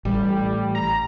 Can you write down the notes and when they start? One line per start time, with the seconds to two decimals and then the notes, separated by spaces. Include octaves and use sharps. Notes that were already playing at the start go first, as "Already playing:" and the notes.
0.05 A1 G3
0.75 A#5